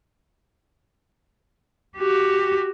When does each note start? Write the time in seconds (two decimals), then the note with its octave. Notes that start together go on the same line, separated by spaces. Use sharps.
1.98 F#4 G4